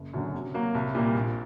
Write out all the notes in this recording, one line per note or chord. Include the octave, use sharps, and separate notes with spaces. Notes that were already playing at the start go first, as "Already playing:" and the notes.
Already playing: F#1
F#2 D3 F#3
C3
F#3 A#3 F#4
C2
A#2 G3 A#3
A#1